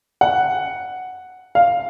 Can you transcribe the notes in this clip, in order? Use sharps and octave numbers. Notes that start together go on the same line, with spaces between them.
F#5
F5